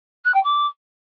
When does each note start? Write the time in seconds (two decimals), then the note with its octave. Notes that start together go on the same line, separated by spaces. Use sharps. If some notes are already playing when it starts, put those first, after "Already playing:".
0.25 F#6
0.34 G5
0.43 D6